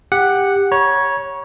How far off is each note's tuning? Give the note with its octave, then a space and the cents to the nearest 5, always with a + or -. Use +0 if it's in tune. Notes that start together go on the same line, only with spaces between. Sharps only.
G4 +15 F#5 +0
C#5 +0 A#5 +45